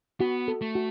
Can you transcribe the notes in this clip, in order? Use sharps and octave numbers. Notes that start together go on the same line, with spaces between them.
B3 F#4
A4
A3
F#4